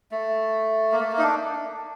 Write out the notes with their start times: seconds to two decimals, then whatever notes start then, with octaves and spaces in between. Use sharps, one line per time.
0.11 A3
0.92 A#3
1.00 A3
1.12 A#3
1.18 D#4
1.23 D4